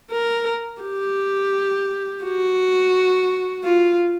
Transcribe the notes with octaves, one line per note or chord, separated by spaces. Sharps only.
A#4
G4
F#4
F4